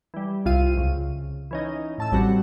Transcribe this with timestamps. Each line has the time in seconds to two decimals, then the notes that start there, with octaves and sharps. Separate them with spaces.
0.14 E3 G3
0.45 C2 C3 F4 F5 D#7
0.77 C#2
1.51 E3 C#4 D#4
1.98 A2 A5 E6
2.11 A1 G3 C4 F#4